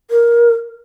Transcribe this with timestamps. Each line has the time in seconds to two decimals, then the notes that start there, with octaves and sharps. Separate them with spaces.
0.11 A#4